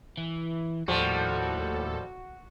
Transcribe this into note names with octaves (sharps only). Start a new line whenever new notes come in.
E3
D#2 A2 F3 G3 F#4 A4